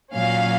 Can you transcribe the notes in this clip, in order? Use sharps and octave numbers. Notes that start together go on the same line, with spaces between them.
A#2 F#3 C#4 F5